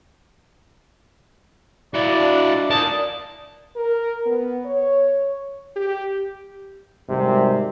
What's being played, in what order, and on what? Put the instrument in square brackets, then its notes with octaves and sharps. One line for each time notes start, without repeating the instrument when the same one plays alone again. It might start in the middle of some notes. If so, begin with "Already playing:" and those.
[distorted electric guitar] E4 F#4 [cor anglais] D5
[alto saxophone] D4
[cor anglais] D#4 [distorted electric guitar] A#4 D5 [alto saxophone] A5
[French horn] A#4
B3
C#5
G4
[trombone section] G#1 G#2 C3 G3